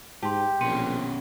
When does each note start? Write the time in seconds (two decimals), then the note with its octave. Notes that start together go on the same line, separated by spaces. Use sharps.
0.23 G#2 G4 A5 C6
0.61 A#1 B2 C#4 C6 C#7 D#7